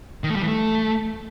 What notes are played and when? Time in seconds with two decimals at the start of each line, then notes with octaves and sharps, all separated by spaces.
0.24 D#3
0.30 A3
0.36 G3
0.42 E3
0.48 A3